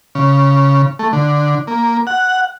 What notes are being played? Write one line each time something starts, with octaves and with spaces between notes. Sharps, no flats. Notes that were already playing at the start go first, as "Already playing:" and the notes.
C#3
A3
D3
A#3
F#5